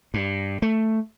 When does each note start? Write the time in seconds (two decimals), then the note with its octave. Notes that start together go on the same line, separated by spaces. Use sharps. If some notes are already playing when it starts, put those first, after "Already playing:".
0.14 G2
0.62 A3